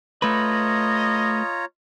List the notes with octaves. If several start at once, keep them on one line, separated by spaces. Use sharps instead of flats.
A3 F4 B4 C#5 D#5 A#5